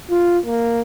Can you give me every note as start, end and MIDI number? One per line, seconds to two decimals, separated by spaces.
0.11 0.38 65
0.46 0.81 58